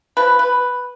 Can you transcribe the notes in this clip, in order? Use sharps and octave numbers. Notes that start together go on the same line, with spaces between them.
F3 B4
B4